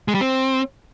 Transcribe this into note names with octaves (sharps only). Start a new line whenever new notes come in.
G#3
G3
C4